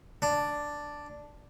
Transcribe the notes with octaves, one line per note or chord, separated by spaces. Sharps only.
D4